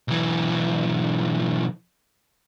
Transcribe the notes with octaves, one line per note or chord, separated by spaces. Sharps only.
B1 E3